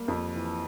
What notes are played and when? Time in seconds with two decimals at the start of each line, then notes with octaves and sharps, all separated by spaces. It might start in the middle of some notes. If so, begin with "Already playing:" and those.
Already playing: G3 A#3
0.08 F2
0.35 E3